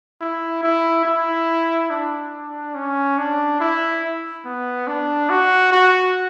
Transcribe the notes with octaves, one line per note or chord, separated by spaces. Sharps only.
E4
E4
E4
D4
C#4
D4
E4
B3
D4
F#4
F#4